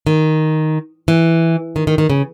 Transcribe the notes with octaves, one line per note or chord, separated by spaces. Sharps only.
D#3
E3
D#3
D#3
D#3
C#3